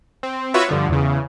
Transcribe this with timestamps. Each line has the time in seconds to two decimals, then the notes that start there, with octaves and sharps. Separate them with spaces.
0.23 C4
0.54 F4 F#4 B4 C#5 E5
0.69 G2 D3 F3
0.88 E2 C#3